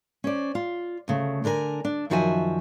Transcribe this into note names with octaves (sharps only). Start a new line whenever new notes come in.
C#4 C5 D5
F4
D2 C#3 A3
D3 D4 A#4 B4 G#5
D4
F#2 D#3 F3 F#4 E5 G#5